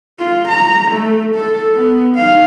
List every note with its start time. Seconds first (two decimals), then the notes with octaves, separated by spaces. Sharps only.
0.19 F4
0.48 A#5
0.91 A3
1.35 A4
1.75 B3
2.16 D#4 F5